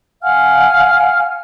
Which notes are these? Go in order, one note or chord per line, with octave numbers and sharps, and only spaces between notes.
F5 F#5 G#5 F6